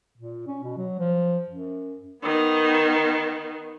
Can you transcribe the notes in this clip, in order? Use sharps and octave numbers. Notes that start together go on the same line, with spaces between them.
A#2
C#4
B2
F#3
F3
F#2
D#3 B3